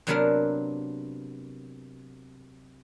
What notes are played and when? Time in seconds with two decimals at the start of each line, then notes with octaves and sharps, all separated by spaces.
0.07 C3 F#3 A#3 B3 D4 A#4